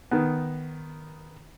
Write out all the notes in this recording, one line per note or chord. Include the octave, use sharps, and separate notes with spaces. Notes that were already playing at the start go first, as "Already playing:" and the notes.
D#3 B3